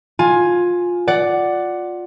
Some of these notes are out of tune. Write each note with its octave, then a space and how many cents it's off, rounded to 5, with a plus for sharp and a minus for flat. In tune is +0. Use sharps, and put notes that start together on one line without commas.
F4 +15 G#5 +5
D5 +0 F#5 +10